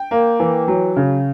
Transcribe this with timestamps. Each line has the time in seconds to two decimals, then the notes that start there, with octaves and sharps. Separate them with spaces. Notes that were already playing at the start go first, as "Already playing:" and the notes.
Already playing: G5
0.11 A#3
0.40 E3
0.68 F#3
0.96 C#3